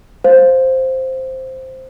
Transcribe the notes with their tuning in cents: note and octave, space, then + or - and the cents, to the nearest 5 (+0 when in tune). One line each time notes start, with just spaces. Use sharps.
C5 +0 F5 +0